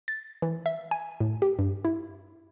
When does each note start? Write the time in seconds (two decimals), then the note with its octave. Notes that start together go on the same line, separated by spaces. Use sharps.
0.08 A6
0.42 E3
0.66 E5
0.91 G#5
1.20 A2
1.42 G4
1.59 G2
1.85 E4